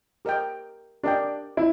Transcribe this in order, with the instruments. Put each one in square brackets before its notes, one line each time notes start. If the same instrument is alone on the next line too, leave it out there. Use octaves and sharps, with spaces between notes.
[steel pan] G4 A#4 D#5 G5
[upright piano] D4 [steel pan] G4 A#4 D#5 G5
[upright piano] E4